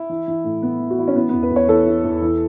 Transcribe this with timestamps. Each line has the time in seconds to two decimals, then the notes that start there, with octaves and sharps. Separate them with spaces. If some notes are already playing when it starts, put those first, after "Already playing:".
Already playing: E4
0.10 E3
0.28 E3
0.44 A2
0.62 A2 B3
0.80 E3
0.90 F#4
0.98 E3 E4
1.08 C#4
1.16 E3 B3
1.29 B3
1.33 E2
1.43 B4
1.51 E2
1.56 C#5
1.69 E3 A4
1.86 E3
2.04 E2
2.22 E3